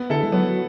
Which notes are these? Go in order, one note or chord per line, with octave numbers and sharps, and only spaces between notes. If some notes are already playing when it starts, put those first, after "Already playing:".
Already playing: B3
D3 E4 A4
G#3
F#3 B3
F#3